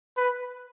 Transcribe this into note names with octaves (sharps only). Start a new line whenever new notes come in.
B4